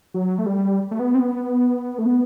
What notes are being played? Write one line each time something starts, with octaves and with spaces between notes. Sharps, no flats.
F#3
A3
G3
A3
B3
C4
B3
A3
B3